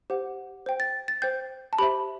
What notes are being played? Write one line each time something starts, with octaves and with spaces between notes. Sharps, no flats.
G4 C5 F#5
C5 G5
A6
A6
C5 G5 G6
A5
G4 C5 E5 B5